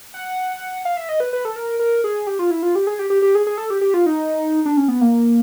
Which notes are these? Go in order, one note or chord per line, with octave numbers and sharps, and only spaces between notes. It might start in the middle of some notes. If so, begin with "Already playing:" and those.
F#5
F5
E5
D#5
B4
B4
A4
A#4
A#4
G#4
G4
F4
E4
F4
G4
G#4
G4
G4
G4
G#4
G#4
A4
G4
G4
F4
D#4
D4
C#4
B3
A#3